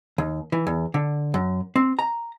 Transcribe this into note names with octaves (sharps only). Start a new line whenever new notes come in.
D#2
E3
E2
D3
F#2
C4
A#5